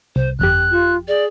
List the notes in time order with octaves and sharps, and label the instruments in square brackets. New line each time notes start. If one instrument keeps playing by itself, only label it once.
[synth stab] C2 [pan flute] C5
[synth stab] G1 F2 G4 [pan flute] F#6
[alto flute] F4
[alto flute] G#4 [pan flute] D5